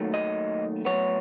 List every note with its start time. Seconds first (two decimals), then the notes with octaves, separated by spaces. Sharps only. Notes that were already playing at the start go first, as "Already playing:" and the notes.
Already playing: D#2 D#3 F#3 A3
0.14 D#5
0.85 A2 F#3 B3 C#5